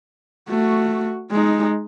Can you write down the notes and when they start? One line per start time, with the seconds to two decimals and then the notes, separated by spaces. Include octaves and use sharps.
0.49 A3 F#4
1.31 G#3 D#4